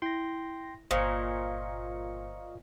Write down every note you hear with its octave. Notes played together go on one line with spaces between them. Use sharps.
E4 G5 C6 A#6
G1 A#2 C5 D#5 F5 C#6 C#7